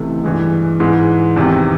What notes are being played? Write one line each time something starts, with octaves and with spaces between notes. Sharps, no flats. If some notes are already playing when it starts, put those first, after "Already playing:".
Already playing: C#2 C3 E3 A3
G2 E3 G#3
G#2 E3 G#3
E2 C3 D#3